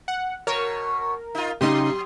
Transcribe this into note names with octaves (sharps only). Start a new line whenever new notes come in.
F#5
B2 A#4 C#5
D#4 F4
C#3 F#3 D#4 G4 C6 D#6